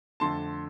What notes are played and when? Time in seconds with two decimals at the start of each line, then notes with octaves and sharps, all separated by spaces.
0.20 F2 D3 A3 D4 A5 C6